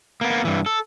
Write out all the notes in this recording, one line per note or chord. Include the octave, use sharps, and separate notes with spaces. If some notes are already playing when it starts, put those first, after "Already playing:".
A#3 B3
G2 E3
A4